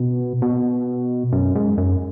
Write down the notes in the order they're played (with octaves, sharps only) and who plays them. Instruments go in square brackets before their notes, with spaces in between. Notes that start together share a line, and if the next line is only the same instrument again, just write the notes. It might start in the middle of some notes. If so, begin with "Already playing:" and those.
Already playing: [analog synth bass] B2
B2
F#2
G#2
F#2